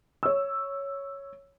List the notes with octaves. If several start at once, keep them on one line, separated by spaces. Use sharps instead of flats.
C#5 E6